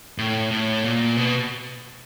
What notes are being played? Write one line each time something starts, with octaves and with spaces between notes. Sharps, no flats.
A2
A2
A#2
B2